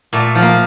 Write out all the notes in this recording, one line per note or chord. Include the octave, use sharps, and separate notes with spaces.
A#2 A3
F3
A#3